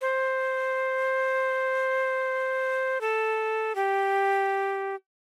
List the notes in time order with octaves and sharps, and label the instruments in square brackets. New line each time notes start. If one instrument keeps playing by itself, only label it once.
[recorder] C5
A4
G4